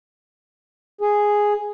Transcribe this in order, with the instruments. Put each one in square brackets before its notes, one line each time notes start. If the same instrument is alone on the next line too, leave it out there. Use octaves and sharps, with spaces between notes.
[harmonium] G#4